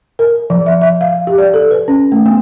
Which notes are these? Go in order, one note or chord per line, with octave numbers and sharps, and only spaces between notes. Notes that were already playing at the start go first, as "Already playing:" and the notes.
A#4
F3
E5
E5
F5
G4
D5
A4
B4
C#4
A3
B3